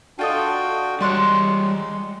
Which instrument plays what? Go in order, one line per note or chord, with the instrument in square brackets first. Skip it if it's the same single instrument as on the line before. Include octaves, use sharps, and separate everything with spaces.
[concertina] D4 F#4 G5 [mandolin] F4 A4 D#5
[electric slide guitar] G3 C#5 [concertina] G#3 [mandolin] D5 C6 F#6